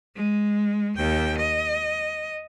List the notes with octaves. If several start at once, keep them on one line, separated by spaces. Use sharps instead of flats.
G#3
D#2 G5
D#5